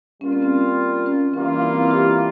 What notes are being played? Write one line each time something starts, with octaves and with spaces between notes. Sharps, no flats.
G3 A#3 C#4 F4
C4
C#4
C#4
E3 G3 A#3 C#4 F4
C4 E4
E4 G4